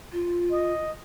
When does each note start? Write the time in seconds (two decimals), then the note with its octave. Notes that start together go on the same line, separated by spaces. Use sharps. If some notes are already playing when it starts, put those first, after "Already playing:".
0.12 F4
0.51 D#5